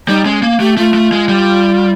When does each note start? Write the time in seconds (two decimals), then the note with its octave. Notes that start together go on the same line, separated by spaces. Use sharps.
0.08 G3 D#4
0.25 G#3 C#4
0.43 A#3
0.60 A3 G4
0.77 A3 F4
0.94 A3
1.12 G#3
1.29 G3